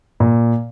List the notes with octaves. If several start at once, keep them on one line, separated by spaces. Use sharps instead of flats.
A#2